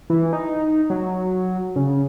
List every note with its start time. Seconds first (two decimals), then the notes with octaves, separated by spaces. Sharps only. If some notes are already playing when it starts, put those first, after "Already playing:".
0.10 E3
0.33 D#4
0.90 F#3
1.76 C#3